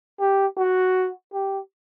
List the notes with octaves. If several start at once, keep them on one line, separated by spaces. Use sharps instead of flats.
G4
F#4
G4